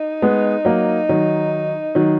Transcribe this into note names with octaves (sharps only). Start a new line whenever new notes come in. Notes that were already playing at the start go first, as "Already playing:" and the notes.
Already playing: D#4
G#3 B3
F#3 A#3
D#3 F#3
D#3 F#3